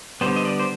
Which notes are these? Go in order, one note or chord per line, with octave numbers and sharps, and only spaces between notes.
D3 G3 B3 C5
D#5
D5
C5